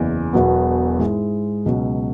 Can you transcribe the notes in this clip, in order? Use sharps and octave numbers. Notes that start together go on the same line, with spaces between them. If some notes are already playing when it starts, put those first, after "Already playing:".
Already playing: F#1 E2 E3
E1 E2 B2 F#3 B3
G#2 G#3 E4
C#2 B2 F#3